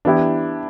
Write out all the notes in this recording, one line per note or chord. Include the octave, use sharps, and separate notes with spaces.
E3 B3 D4 E4 G4